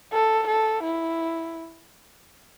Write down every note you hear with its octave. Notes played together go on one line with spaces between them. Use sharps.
A4
A4
E4